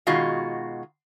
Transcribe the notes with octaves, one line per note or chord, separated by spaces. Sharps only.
B2 D#3 G#3 F4 F#4